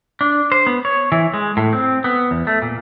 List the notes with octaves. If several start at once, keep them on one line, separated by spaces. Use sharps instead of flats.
D4
C5
B3
C#5
E3
G#3
A2
C4
B3
E2
A3
A#2